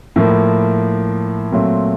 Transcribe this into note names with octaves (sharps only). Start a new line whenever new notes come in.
A2 F3 A#3
A#2 F#3 A3 C4